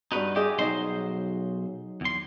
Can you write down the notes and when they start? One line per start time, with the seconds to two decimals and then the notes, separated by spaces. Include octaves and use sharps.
0.12 G2 D#4 F#4 B4
0.36 G4 G#4 D#5 E5
0.59 B1 F#3 D#4 C5 D#5 C6
2.01 E2 C6